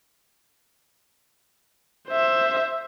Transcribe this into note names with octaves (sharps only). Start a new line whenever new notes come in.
C5 E5